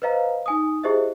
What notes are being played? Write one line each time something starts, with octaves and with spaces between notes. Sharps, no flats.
B4 C5 D#5 F5 A#5
D#4 G#5 D#6
E4 G4 G#4 C5 D#5 E5